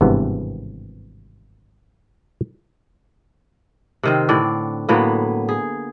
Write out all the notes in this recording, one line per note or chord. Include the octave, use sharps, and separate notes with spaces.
G#1 G2 C3 E3 B3
C3 D#3 C4
A2 D3 D5
A2 F#3 A#3 B3
G#4